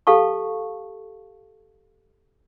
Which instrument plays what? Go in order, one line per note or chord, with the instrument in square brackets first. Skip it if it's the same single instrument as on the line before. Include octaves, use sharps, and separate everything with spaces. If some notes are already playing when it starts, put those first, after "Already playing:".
[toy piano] G4 A4 F5 A5 C#6